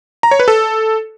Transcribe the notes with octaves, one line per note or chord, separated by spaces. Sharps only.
A#5
C#5
B4
A4